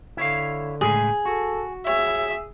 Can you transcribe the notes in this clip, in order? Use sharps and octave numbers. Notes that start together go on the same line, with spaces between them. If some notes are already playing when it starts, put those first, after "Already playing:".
D3 E4 C#5 F5
C#2 A2 G#3 G#4
F#4 A4
G#4 C#5 E5